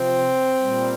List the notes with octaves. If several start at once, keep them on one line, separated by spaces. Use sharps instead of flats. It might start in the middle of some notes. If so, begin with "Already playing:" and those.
Already playing: C3 F3 C4
A#2 G3